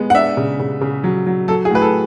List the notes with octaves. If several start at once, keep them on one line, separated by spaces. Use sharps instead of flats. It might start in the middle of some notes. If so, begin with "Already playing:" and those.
Already playing: G#3 B3
F#5
D4 E5
C#3
C#3
C#3
F#3
F#3
F#3 A4
G#4
A2 B4
A4